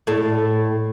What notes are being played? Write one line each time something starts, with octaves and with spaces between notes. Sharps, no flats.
A2 A4